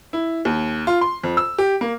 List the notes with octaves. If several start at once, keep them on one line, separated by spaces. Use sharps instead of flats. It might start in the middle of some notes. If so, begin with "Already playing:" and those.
E4
D#2
F4
C6
F2
E6
G4
A#3